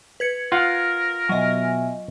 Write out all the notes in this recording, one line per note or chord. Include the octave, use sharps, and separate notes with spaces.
B4 G#6 C#7
F4 A#4 F5 F#5
B2 F#3 D#5 E5 G#5